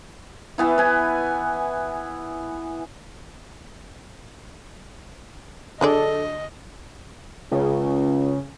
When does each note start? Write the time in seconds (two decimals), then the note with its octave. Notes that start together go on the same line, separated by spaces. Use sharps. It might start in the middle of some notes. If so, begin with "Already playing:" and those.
0.58 E3 B3 E4
0.78 B4 G#5
5.81 D3 F#3 D4 G#4 A4 D5 D#5
7.52 C#2 C#3